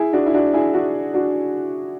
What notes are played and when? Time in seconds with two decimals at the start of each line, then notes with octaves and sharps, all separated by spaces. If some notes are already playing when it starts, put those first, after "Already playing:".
Already playing: E4 G#4
0.13 D4 F#4
0.26 E4
0.34 D4 F#4
0.53 E4 G#4
0.74 D4 F#4
1.14 D4 F#4